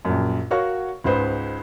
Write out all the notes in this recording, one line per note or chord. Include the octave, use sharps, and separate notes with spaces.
A#1 F#2
F#4 A#4 C#5 F5 F#5 C#6
C#2 G#2 B4 C5